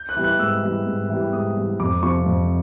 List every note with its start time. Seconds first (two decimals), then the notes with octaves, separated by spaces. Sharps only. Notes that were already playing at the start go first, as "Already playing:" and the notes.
Already playing: G6
0.09 F#6
0.16 E3 G3
0.24 F#6
0.39 G#2 E6
0.63 E3 G3
0.86 G#2
1.09 E3 G3
1.33 G#2 D#6
1.56 E3 G3
1.80 F2 D6
2.03 C3 F3 C#6
2.26 F2